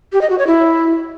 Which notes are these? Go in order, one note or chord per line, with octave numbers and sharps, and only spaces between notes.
G4
D#5
F#4
C#5
E4